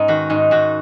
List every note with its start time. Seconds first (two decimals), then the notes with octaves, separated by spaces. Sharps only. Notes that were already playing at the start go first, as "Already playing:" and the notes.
Already playing: G#2 B3 C#4 D#4
0.08 D#3 F#4
0.30 G#2 D#4
0.51 G#2 F#4